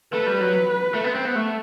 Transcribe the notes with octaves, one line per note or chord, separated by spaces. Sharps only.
A3 B4
G3
F#3
A3
B3
C4
B3
A3